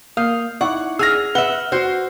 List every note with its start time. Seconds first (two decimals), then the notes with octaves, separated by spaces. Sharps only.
0.17 A#3 F5 D#6 G6
0.61 D#4 E4 D5 F#5 C#6
0.99 G#4 E6 F6 A#6
1.35 B4 E5 F#5 G7
1.72 F#4 C5